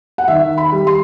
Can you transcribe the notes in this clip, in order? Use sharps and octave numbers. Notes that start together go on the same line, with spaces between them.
F#5
D#3 E5
B5
G3
C6